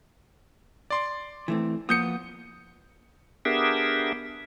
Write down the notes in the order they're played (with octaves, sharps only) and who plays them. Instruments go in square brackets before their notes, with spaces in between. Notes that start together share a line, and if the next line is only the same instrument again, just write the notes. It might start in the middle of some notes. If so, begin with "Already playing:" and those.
[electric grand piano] D5 C6 D6
[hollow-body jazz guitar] E3 A3 C4
[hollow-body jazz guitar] F3 A#3 B3 [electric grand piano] D#6 G6 C#7
[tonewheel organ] B3 D4 G4 G#4 A#4 E5